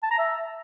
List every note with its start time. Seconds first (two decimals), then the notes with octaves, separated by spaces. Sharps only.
0.03 A5
0.11 A#5
0.18 E5